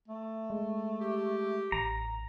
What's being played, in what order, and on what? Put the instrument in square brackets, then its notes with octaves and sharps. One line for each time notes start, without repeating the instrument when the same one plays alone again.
[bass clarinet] A3
[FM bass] G#3
[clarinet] G4
[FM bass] A1 [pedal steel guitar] A#5